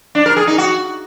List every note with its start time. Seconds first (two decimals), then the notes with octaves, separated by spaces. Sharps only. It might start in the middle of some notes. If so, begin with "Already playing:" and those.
0.15 D4
0.26 A#4
0.37 G#4
0.47 D#4
0.58 F#4